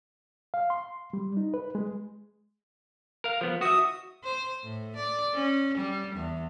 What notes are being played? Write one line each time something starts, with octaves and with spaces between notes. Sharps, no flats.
F5
C6
G3
D#4
B4
G#3
A#4 F5
F3 B3
F#4 E5 D#6
C5
A2
D5
C#4
G3
E2